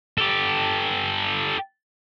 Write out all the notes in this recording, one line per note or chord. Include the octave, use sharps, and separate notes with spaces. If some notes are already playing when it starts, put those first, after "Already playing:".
G4 A4